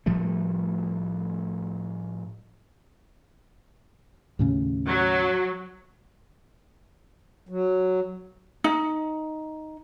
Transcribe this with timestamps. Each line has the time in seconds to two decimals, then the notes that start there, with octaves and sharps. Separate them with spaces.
0.06 A2 F3 G3 A3
4.39 D#2 A2 C#3
4.87 F#3
7.49 F#3
8.64 D#4